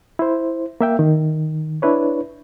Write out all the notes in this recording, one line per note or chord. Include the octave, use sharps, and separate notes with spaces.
E4 C5
A#3 E5 G5
D#3
D4 E4 B4 C#5